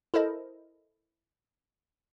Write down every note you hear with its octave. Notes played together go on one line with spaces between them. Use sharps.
E4 A4 A#4 C5 D#5 A5